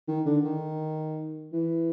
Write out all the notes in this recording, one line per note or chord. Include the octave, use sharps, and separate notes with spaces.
D#3
D3
D#3
E3